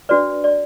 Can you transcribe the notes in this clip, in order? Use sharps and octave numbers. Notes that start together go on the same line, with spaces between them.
D4 F#4 B4 D5
D5